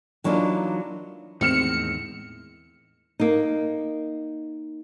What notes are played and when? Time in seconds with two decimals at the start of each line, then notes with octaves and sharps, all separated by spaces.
0.24 E3 F#3 A#3 D4 D#4 F4
1.41 E2 A2 D#3 G#3 C4 F6 C#7 E7
3.20 A#3 D#4